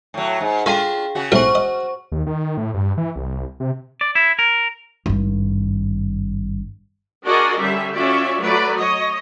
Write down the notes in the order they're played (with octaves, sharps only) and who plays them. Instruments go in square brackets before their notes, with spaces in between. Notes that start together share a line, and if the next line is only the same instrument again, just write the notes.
[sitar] A2 F#3
G#2
[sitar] D4 F4 [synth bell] G#4 F5 G5 [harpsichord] A4 G#5 B5
[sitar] C#3 F#4
[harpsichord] B1 A2 G3 [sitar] F#4 [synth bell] C5 C#6
[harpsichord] D#5
[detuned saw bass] D#2
D#3
A2
G2
E3
C2
C3
[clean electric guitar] D5
E4
A#4
[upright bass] G#1 G2
[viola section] D4 F#4 G#4 A#4 D5 D#5
D3 G3 C#4 E5
C#4 F4 F#4 D5 E5
F#3 A3 B4 D5
C#5 D#5